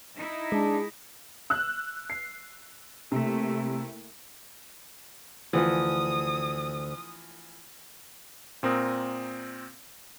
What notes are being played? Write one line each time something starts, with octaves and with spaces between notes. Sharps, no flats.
D#4 E4
G#3 D4 G#4
E6 F#6
C7
C3 A3 A#3 E4
D2 E3 F3 D#6
A#2 C4 A#4 D#6